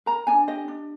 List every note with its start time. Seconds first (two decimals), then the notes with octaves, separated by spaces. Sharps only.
0.06 A#4 A#5
0.27 D4 G#5
0.47 G4 D#5
0.68 D4